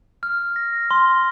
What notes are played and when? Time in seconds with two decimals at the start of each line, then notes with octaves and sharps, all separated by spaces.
0.23 F6
0.56 A#6
0.91 C6